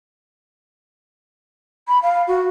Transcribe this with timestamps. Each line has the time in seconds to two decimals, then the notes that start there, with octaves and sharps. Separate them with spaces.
1.88 B5
2.03 F5
2.28 F#4